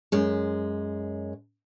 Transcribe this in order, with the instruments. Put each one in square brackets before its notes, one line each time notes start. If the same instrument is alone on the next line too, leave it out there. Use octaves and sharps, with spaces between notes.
[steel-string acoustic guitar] F#2 G#3